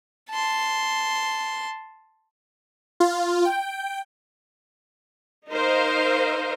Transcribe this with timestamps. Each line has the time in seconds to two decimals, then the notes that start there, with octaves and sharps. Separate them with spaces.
0.30 A5 C6
3.00 F4
3.45 G5
5.49 D#4 A#4 C5 D#5 F5